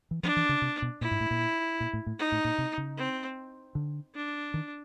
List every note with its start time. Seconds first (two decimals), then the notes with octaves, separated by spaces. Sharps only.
0.11 E3
0.23 F3 D4
0.36 E3
0.49 C#3
0.62 C3
0.82 B2
1.01 A#2 E4
1.11 G#2
1.20 A2
1.31 A#2
1.80 A#2
1.93 A2
2.06 A2
2.19 D#4
2.32 A2
2.44 A#2
2.58 C3
2.78 C#3
2.98 C4
3.75 D3
4.15 D4
4.54 D#3